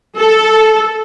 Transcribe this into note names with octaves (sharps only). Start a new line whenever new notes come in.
A4